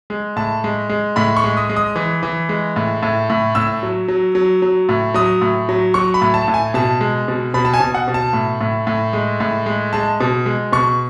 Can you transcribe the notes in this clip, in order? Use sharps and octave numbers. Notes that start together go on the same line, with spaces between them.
G#3
A2 A5
G#3
G#3
A2 B5
C#6
G#3
D#6
G#3
D#6
E3
E3
G#3
A2
A2
A2
A2 E6
F#3
F#3
F#3
F#3
A2
F#3 D#6
A2
F#3
F#3 C#6
B5
A2
A5
A2
G#5
B2 A5
G#3
B2
B2 B5
A5
G#5
B2
F#5
B2
A5
A2
A2
A2
G#3
A2
G#3
G#3 A5
B2
G#3
B2 C#6